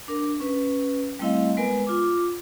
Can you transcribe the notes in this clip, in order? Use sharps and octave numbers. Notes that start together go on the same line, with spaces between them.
D4 A#4
C#4 B4
G3 A3 C4 E4 D#5 F5
G#3 B3 A#4 B4 G#5
F4 D6